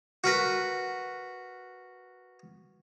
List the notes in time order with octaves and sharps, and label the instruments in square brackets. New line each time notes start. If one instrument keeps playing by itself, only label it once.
[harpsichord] F#4 A#4 B4